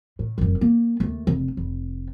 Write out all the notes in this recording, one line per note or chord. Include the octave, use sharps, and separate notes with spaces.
A2
F1 F#2
A#3
D#2 A3
F1
F1